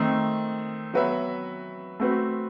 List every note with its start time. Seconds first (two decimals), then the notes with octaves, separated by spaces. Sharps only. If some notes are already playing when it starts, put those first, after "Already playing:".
Already playing: D#3 A3 C4
0.94 F#3 B3 F#4 B4 E5
2.00 A3 C4 F#4 B4